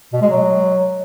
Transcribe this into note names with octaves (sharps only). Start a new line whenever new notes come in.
B2
G#3
F#3